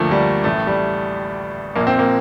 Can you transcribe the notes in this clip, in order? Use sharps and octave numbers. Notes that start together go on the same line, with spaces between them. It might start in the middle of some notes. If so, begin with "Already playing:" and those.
Already playing: D2 D3 F3 A3 A#3
G3
A1 A2 A3
G3
A#1 A#2 A#3
C4
A#3